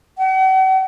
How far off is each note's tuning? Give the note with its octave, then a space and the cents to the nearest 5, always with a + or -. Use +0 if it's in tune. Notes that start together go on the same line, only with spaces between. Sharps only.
F#5 +40